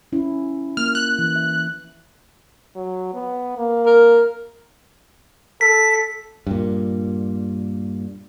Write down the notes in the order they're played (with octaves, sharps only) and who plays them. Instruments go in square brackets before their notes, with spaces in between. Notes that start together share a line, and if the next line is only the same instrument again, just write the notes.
[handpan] C#4 E4
[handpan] A#3 [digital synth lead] F6
[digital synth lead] F#6
[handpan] E3
E5
[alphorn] F#3
B3
A#3
[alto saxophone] A#4
[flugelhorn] A4 [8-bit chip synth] B6
[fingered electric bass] G2 A#2